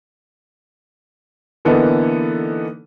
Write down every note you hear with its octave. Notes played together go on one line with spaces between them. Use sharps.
D3 E3 A#3 B3 D#4 A4